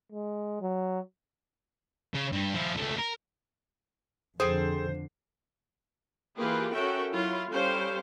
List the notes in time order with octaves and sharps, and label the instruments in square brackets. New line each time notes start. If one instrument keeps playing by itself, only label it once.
[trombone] G#3
F#3
[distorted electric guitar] C#3
G2
F3 E4
C#2 A3
A#4
[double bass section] F2 D3 [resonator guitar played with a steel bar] G#4 A4 G5 [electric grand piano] C5 C7
[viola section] E3 A#3 F4 G4 G#4 B4
C#4 F#4 A4 A#4 E5 G5
F#3 E4 F4
G3 C#4 G4 A4 C5 F5